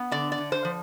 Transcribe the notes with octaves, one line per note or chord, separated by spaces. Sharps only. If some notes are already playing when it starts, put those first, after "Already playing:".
Already playing: B3
D3 D5
D5
D3
C5
F3